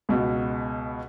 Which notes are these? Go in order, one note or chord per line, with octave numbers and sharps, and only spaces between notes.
C#2 B2